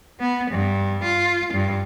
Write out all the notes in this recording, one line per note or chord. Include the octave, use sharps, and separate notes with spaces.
B3
G2
F4
G2